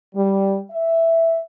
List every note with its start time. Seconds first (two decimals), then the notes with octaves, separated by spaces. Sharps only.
0.15 G3
0.71 E5